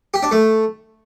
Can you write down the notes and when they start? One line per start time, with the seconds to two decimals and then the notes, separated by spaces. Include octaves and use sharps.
0.14 G4
0.23 D4
0.31 A3